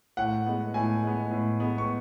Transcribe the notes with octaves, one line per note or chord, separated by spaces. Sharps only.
A2 F#5
G#3 B3
A2 G#5
G#3 B3
A2
G#3 B3
C#6